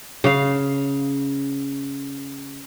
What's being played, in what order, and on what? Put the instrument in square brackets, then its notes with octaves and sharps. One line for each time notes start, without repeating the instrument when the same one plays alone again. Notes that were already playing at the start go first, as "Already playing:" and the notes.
[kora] C#3 F5